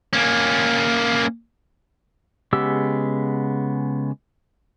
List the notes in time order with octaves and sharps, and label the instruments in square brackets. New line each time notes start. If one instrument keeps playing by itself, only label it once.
[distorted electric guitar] A#3 C#4
[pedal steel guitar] C#3 G#3 B3 G4 E6